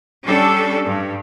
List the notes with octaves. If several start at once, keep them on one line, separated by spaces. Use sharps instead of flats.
G3 C#4 D4 A4
G2